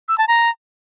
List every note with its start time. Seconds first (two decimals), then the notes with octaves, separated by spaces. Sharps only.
0.08 E6
0.18 A5
0.28 A#5